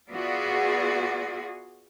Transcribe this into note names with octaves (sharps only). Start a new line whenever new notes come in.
B3 F4 F#4 G#4 D5 E5